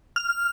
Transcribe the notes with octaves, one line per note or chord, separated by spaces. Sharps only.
F6